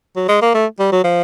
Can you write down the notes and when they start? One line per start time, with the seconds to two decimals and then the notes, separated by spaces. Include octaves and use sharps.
0.16 F#3
0.29 G#3
0.42 A#3
0.54 A3
0.79 G3
0.92 F#3
1.04 F3